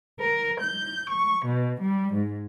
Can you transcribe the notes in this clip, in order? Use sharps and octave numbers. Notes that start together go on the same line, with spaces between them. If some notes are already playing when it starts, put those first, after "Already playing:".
A#4
G6
C#6
B2
G3
G#2